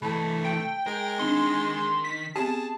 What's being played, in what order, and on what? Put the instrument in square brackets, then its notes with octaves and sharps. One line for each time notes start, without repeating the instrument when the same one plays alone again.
[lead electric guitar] C2 E3 [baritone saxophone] A3 [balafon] A5 B5
[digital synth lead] G5
[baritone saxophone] G#3 [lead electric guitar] A#4
[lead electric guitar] D#3 D#4 [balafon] C4 D4 [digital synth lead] C6
[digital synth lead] B6
[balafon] B3 C4 G4 [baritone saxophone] G#4 [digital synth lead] A5